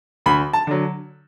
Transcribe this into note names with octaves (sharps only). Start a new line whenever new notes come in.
D2 B5
A5
D3 F#3